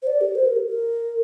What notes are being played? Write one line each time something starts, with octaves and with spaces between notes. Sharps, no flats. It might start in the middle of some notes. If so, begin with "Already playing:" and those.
C5
D5
G4
C5
A#4
G4
A#4